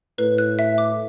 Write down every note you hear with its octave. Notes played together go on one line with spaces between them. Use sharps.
A2 B4
F#6
E5
D6